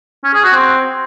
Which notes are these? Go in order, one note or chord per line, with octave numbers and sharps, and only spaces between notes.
C#4
G#4
F#4
C4